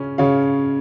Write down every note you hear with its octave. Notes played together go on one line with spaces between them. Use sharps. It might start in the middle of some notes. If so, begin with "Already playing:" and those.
Already playing: C#3 C#4
C#3 C#5 F5